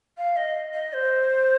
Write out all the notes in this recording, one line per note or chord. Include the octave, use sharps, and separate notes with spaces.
F5
D#5
D#5
C5